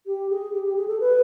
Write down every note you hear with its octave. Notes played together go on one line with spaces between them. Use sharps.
G4
G#4
G4
G4
G#4
A4
B4